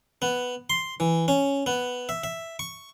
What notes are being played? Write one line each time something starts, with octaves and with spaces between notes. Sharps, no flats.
B3
C6
E3
C#4
B3
E5
E5
C#6